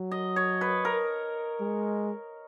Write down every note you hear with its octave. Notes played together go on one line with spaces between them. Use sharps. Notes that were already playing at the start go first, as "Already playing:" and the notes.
Already playing: F#3
D#5
C#5
B4
A#4
G#3